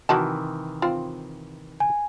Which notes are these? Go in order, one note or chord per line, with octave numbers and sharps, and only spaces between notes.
C3 D#3 E3 F#3 E4 A5
C4 F4
G#5